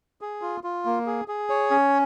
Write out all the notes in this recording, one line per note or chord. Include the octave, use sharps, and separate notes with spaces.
G#4
F4
F4
A#3
G#4
G#4
C#5
C#4